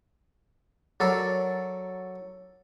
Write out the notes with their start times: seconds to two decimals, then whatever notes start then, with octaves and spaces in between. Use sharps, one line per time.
1.00 F#3 A4 A#4 D5